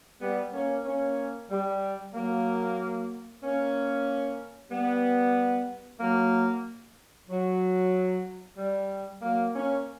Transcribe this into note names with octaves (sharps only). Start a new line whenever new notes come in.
G3 B3
A#3 C#4
A#3 C#4
G3
F#3 A#3
A#3 C#4
G3 B3
F#3 A#3
F#3
G3
F#3 A#3
A#3 C#4